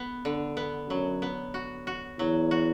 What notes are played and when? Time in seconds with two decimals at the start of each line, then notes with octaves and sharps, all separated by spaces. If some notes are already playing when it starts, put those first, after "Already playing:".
Already playing: B3
0.25 D3
0.57 B3
0.89 F#2 F#3
1.22 B3
1.54 F#4
1.87 F#4
2.18 E2 F#3
2.51 F#4